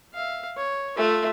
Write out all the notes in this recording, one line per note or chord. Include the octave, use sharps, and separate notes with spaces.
E5 F5
C#5
A3 F4 E5